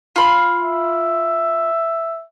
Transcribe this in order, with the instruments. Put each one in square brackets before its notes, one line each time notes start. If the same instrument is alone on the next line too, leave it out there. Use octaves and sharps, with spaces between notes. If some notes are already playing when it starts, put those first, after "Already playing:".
[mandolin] F4 B5 C6
[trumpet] E5